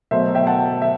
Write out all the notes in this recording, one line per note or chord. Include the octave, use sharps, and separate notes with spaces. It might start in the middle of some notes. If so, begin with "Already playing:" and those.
B2 F#3 A3 C5 E5
E5 G5
F#5 A5
E5